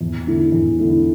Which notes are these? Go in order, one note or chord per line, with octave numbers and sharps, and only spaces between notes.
E2
D3 A3 E4
E2
D3 A3 E4